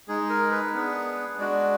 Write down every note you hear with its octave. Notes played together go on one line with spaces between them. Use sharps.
G#3 D#4 G#4
A#4
B4
B3 D4 G#4
G#3 D4 F#4 D5